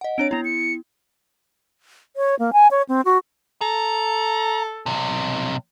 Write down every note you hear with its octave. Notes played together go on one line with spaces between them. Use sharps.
D#5 F#5
C4 D4 C#5 D7
B3 E4 A#5
C#7
C#5
A#3
G#5
C#5
C4
F#4
A4 A#5
B1 C3